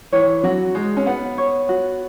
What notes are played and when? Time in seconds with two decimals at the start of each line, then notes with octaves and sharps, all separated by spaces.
0.12 E3 C#5
0.44 F#3 F#4
0.75 G#3 D#4
0.97 C#4
1.06 B3 F#5
1.38 C#5
1.69 F#4